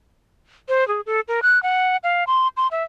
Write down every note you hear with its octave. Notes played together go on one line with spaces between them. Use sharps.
C5
G#4
A4
A#4
F#6
F#5
F5
C6
C6
E5